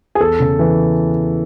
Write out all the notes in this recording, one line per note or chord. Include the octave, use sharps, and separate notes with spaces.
G#4
E2 A4
C#3
E3